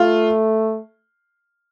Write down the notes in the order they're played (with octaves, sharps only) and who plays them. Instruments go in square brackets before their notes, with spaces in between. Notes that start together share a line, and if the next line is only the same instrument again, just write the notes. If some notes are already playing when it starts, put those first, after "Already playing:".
Already playing: [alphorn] A3 [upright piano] F4